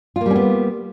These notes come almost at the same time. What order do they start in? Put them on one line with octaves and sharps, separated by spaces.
F4 A#3 G3 C#4 B3